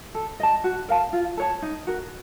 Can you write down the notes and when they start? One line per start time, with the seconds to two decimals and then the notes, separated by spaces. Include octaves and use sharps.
0.15 A4
0.40 D#5 A5
0.64 F#4
0.89 A#4 F5 A5
1.13 F4
1.37 A4 C#5 A5
1.62 D#4
1.87 F#4 A#4